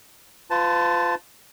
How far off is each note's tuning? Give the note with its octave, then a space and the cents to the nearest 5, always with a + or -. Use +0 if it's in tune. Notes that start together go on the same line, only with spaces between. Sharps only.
F4 +0 B4 +45 A5 +0